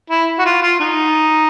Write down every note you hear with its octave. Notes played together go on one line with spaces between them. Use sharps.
E4
F#4
F4
F4
D#4